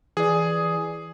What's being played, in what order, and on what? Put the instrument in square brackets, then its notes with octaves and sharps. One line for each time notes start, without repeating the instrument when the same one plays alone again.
[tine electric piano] E3 D5 [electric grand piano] G#4